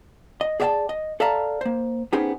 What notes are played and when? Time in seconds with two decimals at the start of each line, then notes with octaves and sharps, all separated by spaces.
0.41 D#5
0.60 G#4 D5 E5 F5 G5 A5
0.89 D#5
1.20 A4 D5 E5 F5 A5 A#5
1.61 A#3 C5
2.13 B3 C#4 D#4 G4 G#4 C5